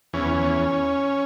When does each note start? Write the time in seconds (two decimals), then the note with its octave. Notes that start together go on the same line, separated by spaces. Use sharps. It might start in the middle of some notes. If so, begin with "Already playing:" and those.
0.13 E2 C#4
0.34 E2